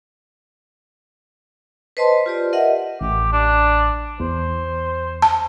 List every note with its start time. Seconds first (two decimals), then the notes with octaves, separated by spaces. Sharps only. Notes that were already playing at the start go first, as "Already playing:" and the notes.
1.97 B4 C5 D#5 A5 C6
2.26 F4 G4 D5
2.53 A#4 D#5 E5 F#5
3.01 A1 G4
3.32 D4
4.20 E2 C5
5.22 A5